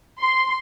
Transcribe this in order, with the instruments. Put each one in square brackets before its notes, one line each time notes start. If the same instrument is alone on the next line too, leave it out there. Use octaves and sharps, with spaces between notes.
[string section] C6